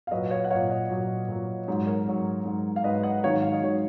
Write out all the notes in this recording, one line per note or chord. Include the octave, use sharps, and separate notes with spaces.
F5
A#2 F#3 B4 D#5
C#5 F5
F#5
A#2 F#3 C#5 F5
D#5 F#5
A#2 F#3
A#2 F#3
G#2 F#3
A#4 C#5
G#2 F#3
G#2 F#3
F5
G#2 F#3 B4 D#5
D#5 F#5
G#2 D#3 F#3 C#5 F5
F5
D#5
G#2 D#3 F#3 C#5